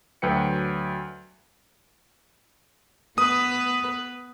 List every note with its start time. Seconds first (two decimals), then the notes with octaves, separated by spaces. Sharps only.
0.22 D2 F#3 B4 G5 C#7
3.18 B3 B4 D#6